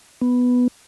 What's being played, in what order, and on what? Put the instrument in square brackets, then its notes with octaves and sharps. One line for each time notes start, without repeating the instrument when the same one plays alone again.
[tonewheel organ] B3